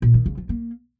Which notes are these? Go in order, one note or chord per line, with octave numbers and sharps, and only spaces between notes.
A#2
D#3
C#3
F3
A#3